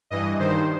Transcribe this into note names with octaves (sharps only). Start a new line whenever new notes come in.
G2 E3 D#5
G2 D#3 C5